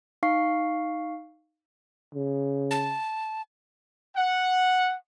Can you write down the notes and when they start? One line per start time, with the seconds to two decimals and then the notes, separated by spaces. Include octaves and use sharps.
0.23 D#4 F5 C#6 C7
2.15 C#3
2.71 A5
4.17 F#5